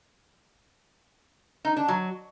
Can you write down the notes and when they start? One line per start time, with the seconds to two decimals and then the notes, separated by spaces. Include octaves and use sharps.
1.65 D#4
1.77 D4
1.88 F#3